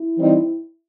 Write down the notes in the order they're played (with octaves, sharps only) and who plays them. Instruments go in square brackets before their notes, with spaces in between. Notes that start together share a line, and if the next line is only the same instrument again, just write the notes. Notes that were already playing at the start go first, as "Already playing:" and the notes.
Already playing: [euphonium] E4
[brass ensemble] E3 G3 C4 D#4